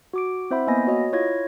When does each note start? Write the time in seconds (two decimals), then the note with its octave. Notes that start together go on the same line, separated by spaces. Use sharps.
0.13 F#4 D6 D7
0.51 C4 E4 C5 E5 F#5 B5
0.67 A#3 B3 D#5 G#5 B5 A#6
0.87 F#4 C#5 D#5
1.12 E4 F4 C#5 F5 G#6 A#6